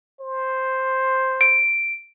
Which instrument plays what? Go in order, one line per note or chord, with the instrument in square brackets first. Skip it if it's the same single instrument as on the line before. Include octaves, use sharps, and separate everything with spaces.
[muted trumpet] C5
[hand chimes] D7